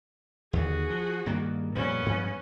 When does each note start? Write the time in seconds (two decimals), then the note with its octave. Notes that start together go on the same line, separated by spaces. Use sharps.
0.53 D#2 D3 F#4 G#4
0.90 F3
1.26 G2 D#3 A#3
1.75 F2 A#2 G3 B3 C#4
2.06 G2 F3 G#3